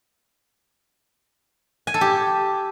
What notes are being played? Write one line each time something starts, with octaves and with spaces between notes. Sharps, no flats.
G#5
A4
G4